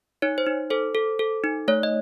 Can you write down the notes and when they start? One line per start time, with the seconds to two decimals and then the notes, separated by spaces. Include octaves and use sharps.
0.22 D#4 C#5
0.38 C5
0.46 D#4
0.70 A4 C5
0.95 A4
1.19 A4
1.44 D#4
1.68 A3 C#5
1.83 D#5